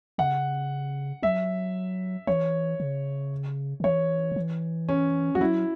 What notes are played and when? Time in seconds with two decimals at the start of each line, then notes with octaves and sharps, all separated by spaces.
0.18 C#3 F#5
1.23 F#3 E5
2.27 E3 C#5
2.80 C#3
3.80 C#3
3.84 E3 C#5
4.32 C#3
4.36 E3
4.89 C#4
5.35 E3 F#4
5.41 F#3 E4